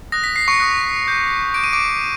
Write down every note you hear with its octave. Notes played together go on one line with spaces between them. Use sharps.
D#6 F#6 A#6
B6
C7
C#6 C#7
D#6 F#6
D6 G6
D6 G6 D7
D#7
D6 D7